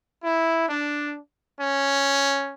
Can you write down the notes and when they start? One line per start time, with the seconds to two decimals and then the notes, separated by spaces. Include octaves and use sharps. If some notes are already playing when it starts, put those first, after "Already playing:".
0.24 E4
0.69 D4
1.60 C#4